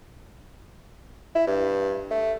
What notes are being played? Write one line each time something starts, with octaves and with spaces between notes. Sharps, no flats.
E4
G2
A3